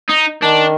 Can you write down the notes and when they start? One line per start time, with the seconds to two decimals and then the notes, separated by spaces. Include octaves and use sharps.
0.09 D#4
0.43 D#3 D4